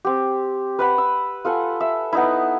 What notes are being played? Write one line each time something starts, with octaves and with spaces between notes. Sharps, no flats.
C4 G4
B4 F#5 B5
E6
F4 A4 F#5 G#5
E5
B3 D#4 E4